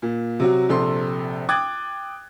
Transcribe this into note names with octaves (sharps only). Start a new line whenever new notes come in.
A#2
C3 F#3 F#4
A#1 C3 A4 C6
G5 D6 D#6 F#6 G#6 A6